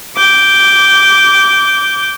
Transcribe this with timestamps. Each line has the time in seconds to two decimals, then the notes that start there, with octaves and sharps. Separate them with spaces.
0.16 D6 G6